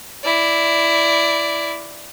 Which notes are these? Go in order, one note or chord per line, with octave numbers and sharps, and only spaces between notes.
E4 D5